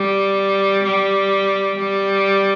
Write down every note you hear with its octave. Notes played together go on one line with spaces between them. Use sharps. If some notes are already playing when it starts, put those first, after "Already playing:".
Already playing: G3
G3
G3